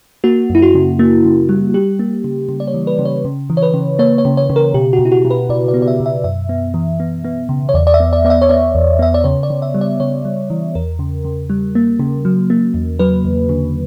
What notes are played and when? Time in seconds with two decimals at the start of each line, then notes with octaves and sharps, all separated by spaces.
0.24 A#3 F#4
0.50 F#2 E4
0.62 F#4
0.75 C#3
0.99 A#3
1.25 C#3
1.49 G3
1.74 G3 G4
1.99 A#3
2.24 C#3
2.49 C#3
2.60 D5
2.67 C#5
2.74 E3
2.87 B4
2.99 C#3
3.05 C#5
3.25 C#3
3.50 E3
3.57 C#5
3.62 B4
3.74 C#3
3.99 A#3 C#5
4.18 C#5
4.25 C#3
4.37 C#5
4.50 C#3
4.56 A#4
4.74 B2 G4
4.93 F#4
4.99 B2
5.05 E4
5.12 F#4
5.25 B2
5.31 B4
5.49 B2 D5
5.68 D5
5.74 B3
5.82 D5
5.88 E5
6.00 B2
6.06 E5
6.24 F#2 E5
6.49 B3
6.74 E3
7.00 B3
7.25 B3
7.49 C#3
7.69 C#5
7.74 E2 D5
7.87 D5
7.94 E5
8.00 B3
8.13 D5
8.25 B3 D5
8.30 E5
8.42 C#5
8.49 B3 D5
8.75 E2
8.99 B3 E5
9.14 D5
9.24 C#3 C#5
9.43 D5
9.50 C#3
9.62 E5
9.74 G3
9.81 D5
10.00 C#3 C#5
10.25 G3
10.50 E3
10.75 E2 A#4
10.99 C#3
11.25 C#3
11.50 G3
11.75 A#3
11.99 C#3
12.25 F#3
12.50 A#3
12.74 E2
12.99 F#3 B4
13.25 E2
13.49 D3